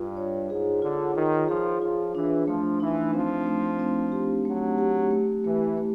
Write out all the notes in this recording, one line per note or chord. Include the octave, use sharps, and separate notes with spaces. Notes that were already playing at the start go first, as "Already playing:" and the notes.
Already playing: G2 F4
C#5
G#2 G#4
D3 F4
D#3 F4
F3 G#4
F3 F4
E3 D4
F3 A3
E3 D#4
F3 C4
A3
C4
G4
F#3 A3
G4
A3
E3 A3
A3